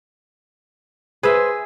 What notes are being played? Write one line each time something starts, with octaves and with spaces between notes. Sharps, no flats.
G#4 B4 C5 E5